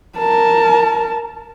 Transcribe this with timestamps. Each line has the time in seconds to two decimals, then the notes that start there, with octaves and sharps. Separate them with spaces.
0.18 A#4 A5